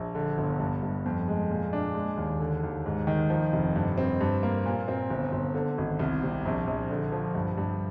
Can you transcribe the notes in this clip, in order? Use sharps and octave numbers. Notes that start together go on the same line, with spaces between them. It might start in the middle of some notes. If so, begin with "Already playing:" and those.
Already playing: A#1
D3
G1
G2
G2
F2
G#3
A#2
D4
G#3
D#2
D3
D#2
G#2
D#3
F3
F1
G2
C4
G2
A#3
A#2
C4
G1
G1
D3
G#1
C2
C3
A#1
A#1
D3
F3
G2
G2